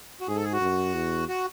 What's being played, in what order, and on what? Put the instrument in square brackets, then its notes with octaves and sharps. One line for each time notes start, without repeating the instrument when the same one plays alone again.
[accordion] F#4
[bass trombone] G#2 [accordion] G#4
[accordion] A4
G#4
F#4
[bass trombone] F#2
E2
[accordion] F#4